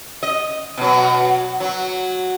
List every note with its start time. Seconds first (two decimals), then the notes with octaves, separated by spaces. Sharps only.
0.23 D#5
0.78 B2 F#3
1.60 F#3